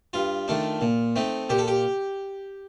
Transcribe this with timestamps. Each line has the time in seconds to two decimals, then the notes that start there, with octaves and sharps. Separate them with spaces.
0.13 G2 F4
0.48 D#3 A3 D4
0.81 A#2
1.16 A3 C4 D#4
1.49 A#2 G4
1.59 A4
1.68 G4